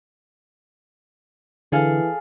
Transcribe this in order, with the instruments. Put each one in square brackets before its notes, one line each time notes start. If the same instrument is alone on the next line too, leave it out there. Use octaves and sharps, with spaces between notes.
[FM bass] D3 [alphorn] E3 [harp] G#4 A4 F5